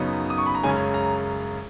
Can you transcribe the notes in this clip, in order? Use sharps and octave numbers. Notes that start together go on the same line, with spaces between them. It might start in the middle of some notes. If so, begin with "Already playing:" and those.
Already playing: F#2 C#3 F#3 B3 D#4
D#6
C#6
B5
A#5
F#2 C#3 G#3 C#4 G#5
A#5